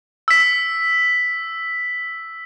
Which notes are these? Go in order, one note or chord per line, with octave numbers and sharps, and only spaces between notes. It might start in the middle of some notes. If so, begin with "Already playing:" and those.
E6 B6